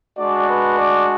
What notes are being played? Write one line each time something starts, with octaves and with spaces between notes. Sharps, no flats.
G#3 D4 F#4 D5
B4
D5